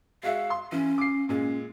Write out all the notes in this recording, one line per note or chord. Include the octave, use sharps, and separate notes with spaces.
G#3 F#4 E5 F5
C6
E3 C#4
D6 C7
A#2 G#3 C#4